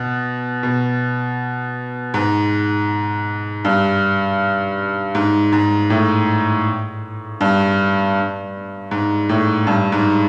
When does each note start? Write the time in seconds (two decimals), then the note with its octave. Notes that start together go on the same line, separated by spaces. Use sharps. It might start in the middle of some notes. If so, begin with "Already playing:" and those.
Already playing: B2
0.63 B2
2.14 G#2
3.65 G2
5.15 G#2
5.52 G#2
5.90 A2
7.41 G2
8.91 G#2
9.29 A2
9.67 G2
9.92 G#2